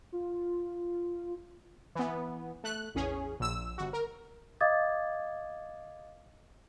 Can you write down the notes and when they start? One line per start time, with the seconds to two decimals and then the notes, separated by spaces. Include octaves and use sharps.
0.12 F4
1.95 E3 B3
2.64 A3 F#6
2.95 A1 E2 C#4 G#4
3.40 A#1 E6
3.78 G1 F#4
3.93 A#4
4.61 D#5 F5 D6 D#6 G#6 A6